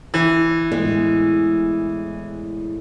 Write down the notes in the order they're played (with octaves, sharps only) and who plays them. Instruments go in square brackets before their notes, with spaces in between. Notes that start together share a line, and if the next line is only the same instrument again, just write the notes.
[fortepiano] E3
[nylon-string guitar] E2 A2 G#3